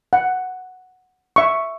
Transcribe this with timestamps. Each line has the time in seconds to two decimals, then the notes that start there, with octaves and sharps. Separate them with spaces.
0.13 F#5
1.36 E5 C#6